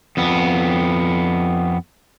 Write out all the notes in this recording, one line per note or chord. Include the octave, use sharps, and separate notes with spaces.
F2 B3